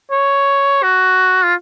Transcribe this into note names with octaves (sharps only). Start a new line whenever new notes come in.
C#5
F#4
F4